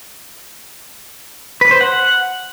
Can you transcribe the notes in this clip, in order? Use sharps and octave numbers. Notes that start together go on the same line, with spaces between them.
B4
C5
F#5